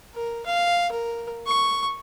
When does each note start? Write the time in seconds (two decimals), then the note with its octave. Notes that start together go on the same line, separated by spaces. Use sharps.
0.14 A#4
0.46 F5
0.91 A#4
1.47 C#6